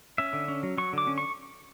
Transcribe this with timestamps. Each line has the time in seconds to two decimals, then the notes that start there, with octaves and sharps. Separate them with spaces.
0.18 C#4 E5
0.33 D3
0.48 C#4
0.63 F#3
0.78 F#3 C#6
0.93 D3 D6
1.07 C#4
1.18 C#6